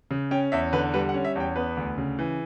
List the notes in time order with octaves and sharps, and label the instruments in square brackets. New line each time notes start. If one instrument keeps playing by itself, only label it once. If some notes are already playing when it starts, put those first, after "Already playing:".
[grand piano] C#3
C#4 G5
E2 E5
D3 B4
G3 B4
F#5
C#4
E5
E2 G5
B3 B4
D2
C#3
E3